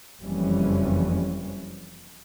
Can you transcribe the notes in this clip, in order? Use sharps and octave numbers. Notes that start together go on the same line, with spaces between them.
F#1 F2 E3 G3 C#4